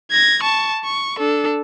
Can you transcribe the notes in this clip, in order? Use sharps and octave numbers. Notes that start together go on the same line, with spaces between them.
G#6 A#6
A5 C#6
C#6
D4 A4